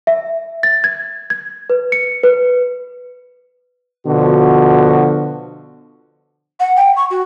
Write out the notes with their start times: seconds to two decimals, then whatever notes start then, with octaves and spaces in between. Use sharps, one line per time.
0.07 E5
0.63 A6
0.84 G#6
1.30 G#6
1.70 B4
1.92 C#7
2.23 B4
4.08 B2 D3 F3 F#4
6.60 F#5
6.76 G5
6.96 C#6
7.10 F#4